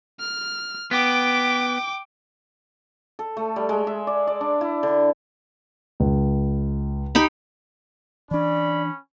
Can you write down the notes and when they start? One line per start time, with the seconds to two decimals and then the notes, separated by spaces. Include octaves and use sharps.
0.20 F6
0.91 B3 G5 D6
3.19 A4
3.37 A3
3.56 G3
3.69 G#3
3.87 E5
4.07 D5
4.27 D5
4.41 D4
4.61 E4
4.83 D3
6.00 C#2
7.15 D#4 G4 B5
8.31 E3 C#4 D4 D5 B5